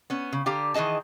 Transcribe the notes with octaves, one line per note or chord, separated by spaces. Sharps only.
B3 C#4
C#3
D3 G4 F5 A#5
D#3 E3 G#4 D#5 A5